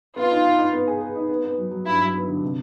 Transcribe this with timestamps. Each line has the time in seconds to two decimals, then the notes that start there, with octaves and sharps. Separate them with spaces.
0.16 B3 F4
0.31 D#4
0.44 D#4
0.59 D#4
0.73 B3
0.88 G#4
1.01 G#4
1.16 D#4
1.29 B3
1.43 B3
1.58 F#3
1.71 F#3
1.85 G2 E4
2.01 F#3
2.14 B3
2.28 D3
2.42 C3